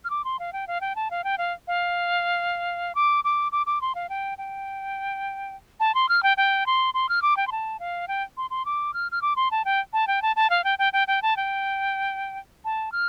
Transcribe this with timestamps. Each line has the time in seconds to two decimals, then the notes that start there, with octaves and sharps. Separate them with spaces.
0.04 F6
0.10 D6
0.24 C6
0.39 F5
0.53 G5
0.67 F5
0.81 G5
0.96 A5
1.11 F5
1.24 G5
1.38 F5
1.68 F5
2.95 D6
3.24 D6
3.52 D6
3.66 D6
3.81 C6
3.95 F5
4.09 G5
4.38 G5
5.80 A5
5.95 C6
6.09 F6
6.23 G5
6.37 G5
6.66 C6
6.94 C6
7.09 F6
7.22 D6
7.37 G5
7.47 C6
7.52 A5
7.80 F5
8.08 G5
8.37 C6
8.50 C6
8.65 D6
8.94 F6
9.12 F6
9.22 D6
9.36 C6
9.51 A5
9.65 G5
9.93 A5
10.07 G5
10.22 A5
10.36 A5
10.50 F5
10.64 G5
10.79 G5
10.93 G5
11.08 G5
11.22 A5
11.36 G5
12.65 A5
12.92 F6